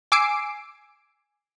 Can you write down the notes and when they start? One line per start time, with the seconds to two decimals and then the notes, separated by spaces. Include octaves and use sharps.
0.12 G#5 D6 E6 C7 D7